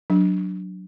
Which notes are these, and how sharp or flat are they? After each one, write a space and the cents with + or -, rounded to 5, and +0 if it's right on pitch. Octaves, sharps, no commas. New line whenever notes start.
F#3 +0 D4 +0